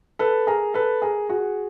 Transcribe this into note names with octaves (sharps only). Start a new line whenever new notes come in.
A4 B4
G#4 A#4
A4 B4
G#4 A#4
F#4 G#4